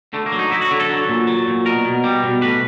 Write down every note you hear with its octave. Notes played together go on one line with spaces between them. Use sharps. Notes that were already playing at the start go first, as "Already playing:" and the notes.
D3 A3
A#3
F#3
D#4
F#3 E4
F#4
D3 E4
A4
F#3
A#2
F#3
A#2
B2 A#4
B2
G3
B2
A2 B4